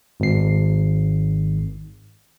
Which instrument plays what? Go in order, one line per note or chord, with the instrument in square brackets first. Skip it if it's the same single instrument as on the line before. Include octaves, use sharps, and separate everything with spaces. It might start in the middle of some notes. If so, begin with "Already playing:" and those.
[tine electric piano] G#1 C7